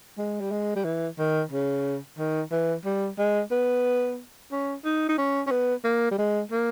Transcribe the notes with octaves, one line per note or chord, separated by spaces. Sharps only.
G#3
G3
G#3
G3
E3
D#3
C#3
D#3
E3
G3
G#3
B3
C#4
D#4
D#4
C#4
C#4
B3
A#3
G3
G#3
A#3